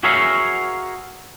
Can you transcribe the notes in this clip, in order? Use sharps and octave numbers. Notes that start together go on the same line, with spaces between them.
F#4 G#4 A#4 C#5 E5 F5